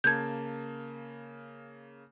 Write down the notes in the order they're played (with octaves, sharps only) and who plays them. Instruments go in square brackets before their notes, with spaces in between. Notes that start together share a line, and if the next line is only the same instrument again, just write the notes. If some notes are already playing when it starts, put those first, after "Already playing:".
[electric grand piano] C#3 A#3 A5 [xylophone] G6 G#6